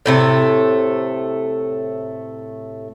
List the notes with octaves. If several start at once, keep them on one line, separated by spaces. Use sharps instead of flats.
A2 C3 A3